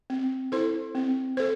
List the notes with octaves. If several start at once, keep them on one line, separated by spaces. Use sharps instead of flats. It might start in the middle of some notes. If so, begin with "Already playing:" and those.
C4
E4 A4 C5
C4
A4 C5